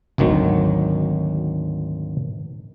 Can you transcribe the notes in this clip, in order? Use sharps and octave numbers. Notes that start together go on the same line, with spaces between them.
G#1 D2 D#3 F#3